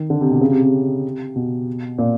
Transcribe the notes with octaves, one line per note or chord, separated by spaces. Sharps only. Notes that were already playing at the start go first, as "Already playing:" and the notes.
Already playing: D#3
D3
C3
B2
C#3
C3
C3
B2
A#2